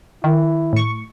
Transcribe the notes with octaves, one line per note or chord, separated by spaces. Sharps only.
D#3 E4
A2 C#6